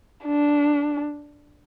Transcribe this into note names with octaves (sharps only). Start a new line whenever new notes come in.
D4